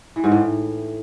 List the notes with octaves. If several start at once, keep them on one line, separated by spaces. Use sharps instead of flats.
E3
G#2
A2